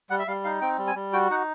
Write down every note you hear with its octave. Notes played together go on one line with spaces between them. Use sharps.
G3 F#5
E5
G3 F5
D#4 F5
C4 G5
G3
G#5
G3
F#4 G5
D#4 F#5